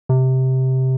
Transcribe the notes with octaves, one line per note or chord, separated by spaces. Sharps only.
C3